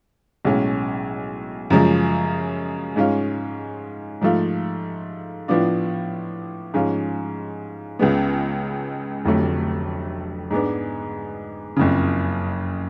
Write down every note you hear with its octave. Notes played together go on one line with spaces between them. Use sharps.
B1 A2 G#3 C#4
F#2 C#3 F3 G#3
G#2 G#3 C#4 F4
G#2 F3 A3 F4
A2 F3 B3 D4 F4
G#2 F3 G#3 C#4 F4
C#2 C#3 G#3 B3
F1 F2 D3 F#3 A3
G#2 G#3 B3 D4
F#1 F2 C#3